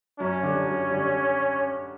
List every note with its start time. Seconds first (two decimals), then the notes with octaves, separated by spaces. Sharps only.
0.20 F#2 C#4
0.43 D3 G3
0.67 F#2
0.91 D3 G3